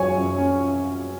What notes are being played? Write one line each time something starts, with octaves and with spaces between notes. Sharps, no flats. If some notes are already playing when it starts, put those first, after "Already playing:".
Already playing: F#2 F#3 C#5 G#5
F#2
C#4